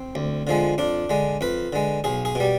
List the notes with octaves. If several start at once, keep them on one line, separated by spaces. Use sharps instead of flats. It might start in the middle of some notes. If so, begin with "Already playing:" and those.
Already playing: C4
D2
D3 F3 G#3
F2 D4
D3 G#3
F2 B4
D3 G#3
B1 G#4
G#4
B2 G3